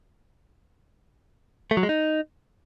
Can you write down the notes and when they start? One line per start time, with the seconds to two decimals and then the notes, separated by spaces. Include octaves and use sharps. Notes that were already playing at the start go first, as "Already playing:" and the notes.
1.71 A3
1.77 F#3
1.83 G#3
1.89 D#4